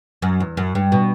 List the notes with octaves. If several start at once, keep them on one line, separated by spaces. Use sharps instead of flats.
F#2
E2
F#2
G2
B2